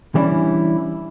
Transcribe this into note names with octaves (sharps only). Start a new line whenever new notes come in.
E3 G3 C#4 D4 E4